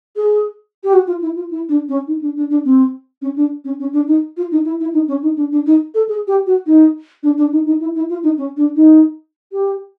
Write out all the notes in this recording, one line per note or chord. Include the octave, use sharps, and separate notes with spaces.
G#4
G4
F#4
F4
E4
F4
E4
D4
C#4
D#4
D4
D4
D4
C4
C#4
D4
C#4
C#4
D4
D#4
F4
D#4
E4
E4
D#4
C#4
D#4
D4
D4
D#4
A4
G#4
G4
F#4
D#4
D4
D4
D#4
D#4
E4
E4
F4
D#4
C#4
D4
D#4
G4